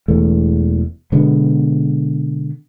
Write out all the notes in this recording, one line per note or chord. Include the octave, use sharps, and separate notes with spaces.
E1 E2 A3
B2 D3 G#3 B3